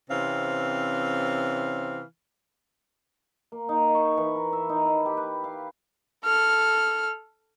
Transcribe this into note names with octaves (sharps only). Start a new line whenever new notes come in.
C3 E3 C4 C#4 F5
A#3
D#4
C#6
E3
A#4
E5
D#4
E4
G4
B4
F5
A4 F6